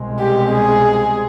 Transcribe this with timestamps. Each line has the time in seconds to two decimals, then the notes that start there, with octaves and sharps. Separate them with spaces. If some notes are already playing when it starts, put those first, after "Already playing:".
Already playing: C2 B2 G#3 C4
0.19 G4
0.52 G#4